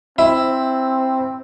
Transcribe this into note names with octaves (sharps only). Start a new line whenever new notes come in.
C4 E4